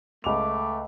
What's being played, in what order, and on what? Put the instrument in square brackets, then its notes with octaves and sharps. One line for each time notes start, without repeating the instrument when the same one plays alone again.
[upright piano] C#2 F7 [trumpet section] A3 D6